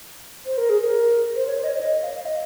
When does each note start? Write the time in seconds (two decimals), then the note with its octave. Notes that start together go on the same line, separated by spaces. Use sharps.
0.46 C5
0.58 A#4
0.70 G#4
0.81 A#4
1.36 C5
1.47 C#5
1.58 C5
1.64 D#5
1.69 C#5
1.81 D#5
2.02 F5
2.17 F5
2.25 D#5